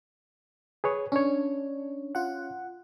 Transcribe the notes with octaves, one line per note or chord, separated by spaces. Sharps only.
G#4 B4 C#5
C#4 D4 C#5
F4 F#5